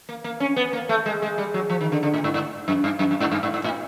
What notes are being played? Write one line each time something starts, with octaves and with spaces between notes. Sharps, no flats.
A#3
A#3
C#4
B3
A#3
A3
G#3
G#3
G3
F#3
F3
D#3
D3
D3
A2
G#2
G#2
F#2
G2
F#2
F#2
G#2
G2
G#2
G#2
A2